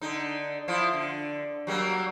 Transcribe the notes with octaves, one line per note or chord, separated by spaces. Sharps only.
D3 D#4
F3 E4 F4
D3
F#3 G3 A#3